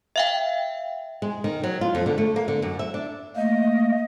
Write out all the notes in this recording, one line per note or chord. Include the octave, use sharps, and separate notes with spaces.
E5 F5 G5
G#3
D#3
F#3
F4
F2
D3
A3
A#3
D3
F#2
E5
D4
A3 A#3 D#5